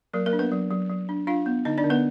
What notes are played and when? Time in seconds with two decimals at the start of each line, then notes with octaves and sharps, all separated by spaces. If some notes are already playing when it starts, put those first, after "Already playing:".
0.13 F#3 A#3 A#4
0.26 A#3 A#4
0.33 D4
0.39 B3 B4
0.52 F#3
0.71 F#3
0.89 F#3
1.09 D4
1.27 D4 F4 F5
1.46 B3
1.65 D3 D#4 D#5
1.78 D4 D5
1.84 D3
1.90 B3 B4